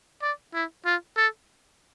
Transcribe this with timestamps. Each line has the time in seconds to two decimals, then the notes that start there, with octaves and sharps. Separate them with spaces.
0.22 D5
0.54 E4
0.86 F4
1.17 A4